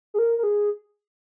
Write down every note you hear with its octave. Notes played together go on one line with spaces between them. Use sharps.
G#4
A#4
A#4
G#4